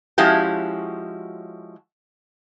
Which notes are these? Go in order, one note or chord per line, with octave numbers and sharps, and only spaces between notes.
F3 G#3 C#4 E4 F#4 G4